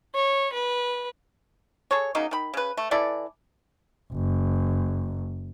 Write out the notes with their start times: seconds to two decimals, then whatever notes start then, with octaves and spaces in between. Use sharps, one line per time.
0.14 C#5
0.53 B4
1.91 G#4 A4 C#5
2.15 C#3 F#3 A#3 D#4
2.31 D#3 B5
2.54 C#3 B4
2.77 A3
2.91 E3 E4 A4 D5
4.13 F#1